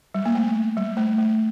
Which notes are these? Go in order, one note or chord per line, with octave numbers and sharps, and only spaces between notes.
G3
A#3
A3
G3
A3
A3